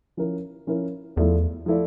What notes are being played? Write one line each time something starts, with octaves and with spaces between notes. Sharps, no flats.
F3 C#4 E4 A#4
F3 C#4 E4 A#4
E2 F3 A3 E4 A4 D5
F3 A3 E4 A4 D5